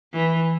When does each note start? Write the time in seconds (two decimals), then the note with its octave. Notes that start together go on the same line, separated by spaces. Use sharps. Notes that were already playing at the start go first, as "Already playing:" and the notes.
0.13 E3